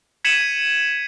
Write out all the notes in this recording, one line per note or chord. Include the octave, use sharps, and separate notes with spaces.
G#6 B6 C#7 D#7 E7 F#7